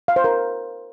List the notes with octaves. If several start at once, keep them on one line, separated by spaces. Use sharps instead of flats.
F5
C5
A#4